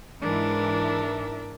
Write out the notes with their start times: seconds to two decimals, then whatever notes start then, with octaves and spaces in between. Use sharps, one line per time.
0.22 G#2 E3 D4 A#4 E5